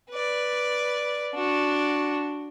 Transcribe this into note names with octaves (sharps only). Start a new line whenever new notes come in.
B4 D5
D4 F#4